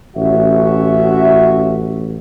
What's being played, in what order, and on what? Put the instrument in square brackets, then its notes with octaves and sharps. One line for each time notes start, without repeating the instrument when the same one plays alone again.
[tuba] A1 [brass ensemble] C#4 F#4 E5